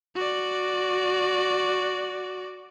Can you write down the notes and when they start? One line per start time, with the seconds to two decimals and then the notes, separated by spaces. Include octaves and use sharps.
0.15 F#4 D5